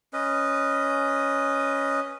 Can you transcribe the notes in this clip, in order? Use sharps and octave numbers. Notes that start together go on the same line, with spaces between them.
C#4 B4 D#5